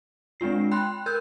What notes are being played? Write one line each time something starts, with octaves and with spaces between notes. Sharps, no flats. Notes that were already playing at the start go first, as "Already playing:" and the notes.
G#3 C4 D4 F4 C7
G5 B5 C6 F#6
A#4 E6 G6